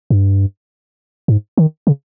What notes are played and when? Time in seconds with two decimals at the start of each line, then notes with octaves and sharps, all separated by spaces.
0.10 G2
1.28 G#2
1.58 D#3
1.87 C#3